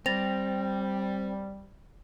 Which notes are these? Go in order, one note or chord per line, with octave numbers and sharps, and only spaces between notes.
G3 C4 A6 A#6 F7